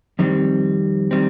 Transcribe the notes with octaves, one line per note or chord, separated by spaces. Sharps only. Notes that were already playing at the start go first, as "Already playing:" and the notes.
F2 D#3 G3 C4
D#3 G3 C4